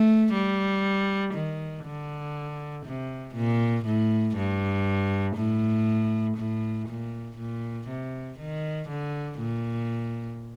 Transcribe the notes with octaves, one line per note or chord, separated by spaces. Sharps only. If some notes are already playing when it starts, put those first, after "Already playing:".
Already playing: A3
G3
D#3
D3
C3
A#2
A2
G2
A2
A2
A#2
A#2
C3
D#3
D3
A#2